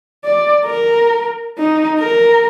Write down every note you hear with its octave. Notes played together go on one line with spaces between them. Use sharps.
D5
A#4
D#4
A#4